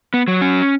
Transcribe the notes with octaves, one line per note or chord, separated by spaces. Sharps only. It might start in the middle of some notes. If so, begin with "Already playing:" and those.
B3
F#3
C#4